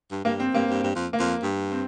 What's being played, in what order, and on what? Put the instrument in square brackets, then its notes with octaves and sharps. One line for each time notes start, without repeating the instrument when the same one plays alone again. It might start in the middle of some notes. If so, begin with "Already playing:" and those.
[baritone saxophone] G2
[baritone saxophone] G2 [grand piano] A#3
[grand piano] C4
[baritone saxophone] G2 [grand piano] A#3
[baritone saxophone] G2
G2
F2
[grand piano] A#3
[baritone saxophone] F2
G2
[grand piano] C4